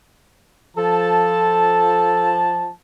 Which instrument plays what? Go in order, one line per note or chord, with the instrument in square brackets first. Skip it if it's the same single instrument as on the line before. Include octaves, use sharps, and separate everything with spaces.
[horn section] F3 A5 [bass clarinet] A4